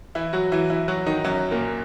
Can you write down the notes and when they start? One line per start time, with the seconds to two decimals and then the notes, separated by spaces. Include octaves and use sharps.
0.15 E3 E4
0.33 F#3 F#4
0.52 E3 E4
0.70 E3 E4
0.88 F#3 F#4
1.07 D#3 D#4
1.24 F#2 F#3
1.51 A#2 A#3